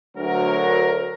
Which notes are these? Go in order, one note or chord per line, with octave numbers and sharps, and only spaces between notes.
D2 F#3 A#4